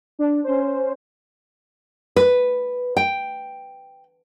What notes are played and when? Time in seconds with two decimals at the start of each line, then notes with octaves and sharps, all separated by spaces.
0.19 D4
0.44 C#4 C5
2.16 B4
2.97 G5